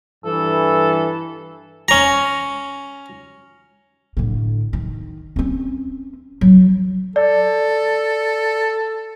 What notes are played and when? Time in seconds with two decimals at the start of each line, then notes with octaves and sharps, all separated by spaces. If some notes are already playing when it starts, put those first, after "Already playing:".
0.25 G2 E3 A4
1.88 C#4 A#5
4.17 A2 D3
4.73 D#3
5.36 C4 C#4
6.41 F#3
7.16 A4 D5